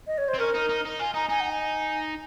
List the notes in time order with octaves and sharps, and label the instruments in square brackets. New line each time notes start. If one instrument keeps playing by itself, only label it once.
[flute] D#5
C#5
C5
[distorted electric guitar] C4
[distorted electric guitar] C#4 [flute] A#4
[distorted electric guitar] D#4
D#4
D#4
[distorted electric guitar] F4 [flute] G#5
[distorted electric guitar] D#4 [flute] A#5
[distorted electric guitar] D#4 [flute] G#5
[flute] F#5
G#5